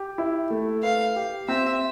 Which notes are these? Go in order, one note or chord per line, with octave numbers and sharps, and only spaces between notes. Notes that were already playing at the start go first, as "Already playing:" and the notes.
Already playing: G4
E4
A3
B4 F5
G4
C4 E5